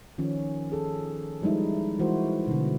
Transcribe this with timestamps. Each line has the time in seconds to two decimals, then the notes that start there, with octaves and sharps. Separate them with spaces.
0.18 D#3 F3 C#4
0.72 G#4 A4
1.42 F3 G3 G#3 D#4 E4
1.99 E3 G#3 E4 F#4 A#4 C5
2.47 B2 D3